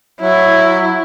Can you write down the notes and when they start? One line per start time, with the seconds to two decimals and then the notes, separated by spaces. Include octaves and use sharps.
0.21 F#3 E4